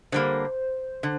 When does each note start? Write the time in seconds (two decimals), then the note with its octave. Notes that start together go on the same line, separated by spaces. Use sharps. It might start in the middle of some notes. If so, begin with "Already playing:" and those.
0.12 D3 G3 A#3 C5
1.03 D3